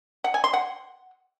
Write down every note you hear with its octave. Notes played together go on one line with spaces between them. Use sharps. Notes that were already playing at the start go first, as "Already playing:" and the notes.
F#5
G#5
C6
F#5